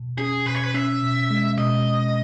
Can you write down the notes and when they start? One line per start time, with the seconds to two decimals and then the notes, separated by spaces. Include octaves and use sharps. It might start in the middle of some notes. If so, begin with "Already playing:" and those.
Already playing: B2
0.18 C#4 G#4
0.46 B2 B4
0.55 C#5
0.63 B4
0.74 C#4 E5
1.02 B2
1.30 G#3
1.58 B2 D#5